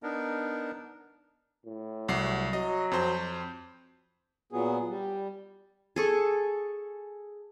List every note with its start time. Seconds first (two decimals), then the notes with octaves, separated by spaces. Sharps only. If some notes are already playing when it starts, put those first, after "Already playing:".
0.03 B3 D4 D#4 A#4
1.66 A2
2.08 C2 F#3 C7
2.53 F#3 D#5
2.92 F2 C5 G6
4.53 A#2 F#3 B3 G#4
4.89 G3
5.96 G#4 A4 C#6